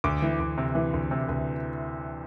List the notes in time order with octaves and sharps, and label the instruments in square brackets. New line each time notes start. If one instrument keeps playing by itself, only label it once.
[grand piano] D2 D6
E3
D2
C3
E3
D2
C3
D2